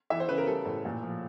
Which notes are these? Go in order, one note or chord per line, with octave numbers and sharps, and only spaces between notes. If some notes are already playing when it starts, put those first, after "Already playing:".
E3 E5
C5
C#3 B4
A#4
G3 A4
A2
A#2
F3